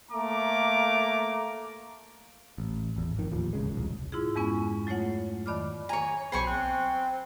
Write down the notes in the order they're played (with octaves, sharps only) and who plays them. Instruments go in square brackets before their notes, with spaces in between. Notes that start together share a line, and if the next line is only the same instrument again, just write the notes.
[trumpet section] A3 A#3 A#5 D6
[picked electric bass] A1
G#1 E2
F2 D#3
D1 D#2 F3
E1 C#3 G#3
E1 C2
[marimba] G#2 E4 F4 G#4
F2 G#3 B3 C#4 G#5
F#3 A3 F4 C#5 F#5
F2 D#3 D5 B5 D6 F6
[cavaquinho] C#5 A#5 [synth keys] G#5
[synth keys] B1 B5 [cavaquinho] C5 G#5 C#6
[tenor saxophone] C4 [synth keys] F#6